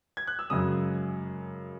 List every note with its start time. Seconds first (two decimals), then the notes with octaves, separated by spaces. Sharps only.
0.17 G#6
0.27 F#6
0.39 E6
0.50 F#2 C#3 G#3 D#6